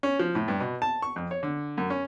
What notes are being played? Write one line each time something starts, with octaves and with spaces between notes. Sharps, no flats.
C#4
F3
A2
G2
B2
A5
C#6
F2
C#5
D3
F#2
C#4